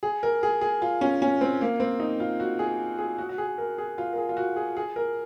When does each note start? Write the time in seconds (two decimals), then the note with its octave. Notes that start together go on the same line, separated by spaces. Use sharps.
0.03 G#4
0.23 A#4
0.43 G#4
0.61 G#4
0.82 F4
1.01 C#4
1.22 C#4
1.41 C4
1.61 A#3
1.80 C4
2.00 D#4
2.20 F4
2.40 F#4
2.59 G#4
2.98 G#4
3.18 F#4
3.29 F#4
3.38 G#4
3.58 A#4
3.78 G#4
3.98 F4
4.13 A#4
4.18 G#4
4.29 F4
4.37 F#4
4.56 G#4
4.77 G#4
4.96 A#4